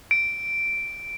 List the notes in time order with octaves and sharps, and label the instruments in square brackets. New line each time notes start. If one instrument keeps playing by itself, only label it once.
[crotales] D7